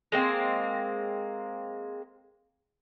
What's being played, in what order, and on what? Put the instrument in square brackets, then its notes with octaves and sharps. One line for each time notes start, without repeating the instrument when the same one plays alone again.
[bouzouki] G#3 A#3 C4